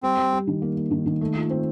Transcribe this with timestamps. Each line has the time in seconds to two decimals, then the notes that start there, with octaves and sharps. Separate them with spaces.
0.03 G3 C4
0.18 G3
0.33 G3
0.47 D#3
0.62 A#3
0.77 A#3
0.91 D#3
1.06 D#3
1.21 A3
1.36 F4
1.50 C4